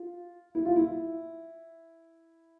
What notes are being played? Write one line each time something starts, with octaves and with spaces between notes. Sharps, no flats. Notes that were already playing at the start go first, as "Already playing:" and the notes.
Already playing: F4
E4
F4
E4